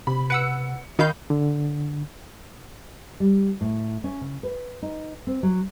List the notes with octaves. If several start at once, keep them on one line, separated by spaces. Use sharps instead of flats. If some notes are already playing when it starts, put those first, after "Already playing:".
C3 B5
B4 F#5 E6 C#7
D#3 D#4 F5 B5 G6
D3
G3
A2
C#4
C#3
B4
D#4
C4
F#3